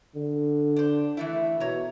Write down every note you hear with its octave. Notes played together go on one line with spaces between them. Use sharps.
D3
D4 C5
E3 A3 E4
B2 C#5 A#5